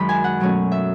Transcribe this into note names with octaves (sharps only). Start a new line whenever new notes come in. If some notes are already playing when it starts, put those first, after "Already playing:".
Already playing: F#2 D#3 G#3 B5
G#5
F#5
B2 F#3 A3 C#4
E5